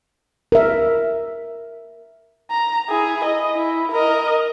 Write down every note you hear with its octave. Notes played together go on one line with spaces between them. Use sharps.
A#4 E5
A#5
E4 G#4
D#5
E4
A#4 D#5